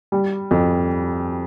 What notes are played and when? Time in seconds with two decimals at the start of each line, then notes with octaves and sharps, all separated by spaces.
0.12 G3
0.51 F2